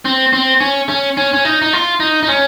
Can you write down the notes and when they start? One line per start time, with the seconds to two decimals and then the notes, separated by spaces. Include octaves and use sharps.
0.05 C4
0.33 C4
0.60 C#4
0.89 C#4
1.17 C#4
1.33 C#4
1.45 D#4
1.62 D#4
1.73 F4
2.00 D#4
2.23 D#4
2.28 C#4